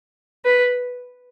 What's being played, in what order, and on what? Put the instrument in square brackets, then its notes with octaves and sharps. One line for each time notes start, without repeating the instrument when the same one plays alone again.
[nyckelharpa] B4